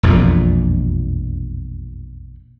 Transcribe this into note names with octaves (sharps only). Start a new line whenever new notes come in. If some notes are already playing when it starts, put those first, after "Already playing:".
E1 A#1 F2 A#2